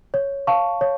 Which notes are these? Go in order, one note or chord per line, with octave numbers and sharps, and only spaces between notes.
C#5
F5 A5 C#6
C#5